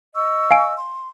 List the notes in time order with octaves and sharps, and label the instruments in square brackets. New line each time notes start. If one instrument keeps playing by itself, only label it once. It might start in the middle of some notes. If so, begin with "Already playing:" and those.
[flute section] D#5 C#6 E6
[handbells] F5 G#5 D7
[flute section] C6